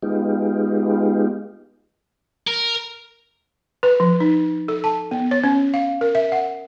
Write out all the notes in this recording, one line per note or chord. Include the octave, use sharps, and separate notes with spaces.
G#3 B3 D#4 F4 G4
A#4
B4
F3
D#4
A4
A5
B3
C#5
C#4
F5
A#4
E5
F#5